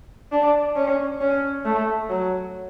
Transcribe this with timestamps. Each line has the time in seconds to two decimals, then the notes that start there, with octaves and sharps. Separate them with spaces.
0.32 D4
0.76 C#4
1.21 C#4
1.65 A3
2.09 F#3